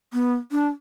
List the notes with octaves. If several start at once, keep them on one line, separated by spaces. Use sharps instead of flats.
B3
D4